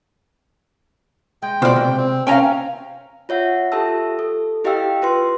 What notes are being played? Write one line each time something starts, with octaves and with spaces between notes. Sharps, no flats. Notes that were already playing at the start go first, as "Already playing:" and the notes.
G#3 G5
B2 F4 C5 D5
C3
C4
C#4 F5 G5 G#5 A#5
F4 C#5 E5 F#5
F4 G4 A4 E5 A5 E6
A4
E4 G4 D#5 F5 G5 E6
F4 B4 C6